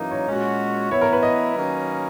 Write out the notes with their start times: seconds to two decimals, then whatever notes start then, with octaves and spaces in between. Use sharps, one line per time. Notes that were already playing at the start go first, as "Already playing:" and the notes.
Already playing: F#2 E3 A#3 D#4
0.11 C#5
0.27 A#2 G#3 C#4 F#4
0.91 E3 B3 E4 C#5
1.01 A#4
1.13 B4
1.23 D#5
1.55 D#3 F#3 A#3 C#4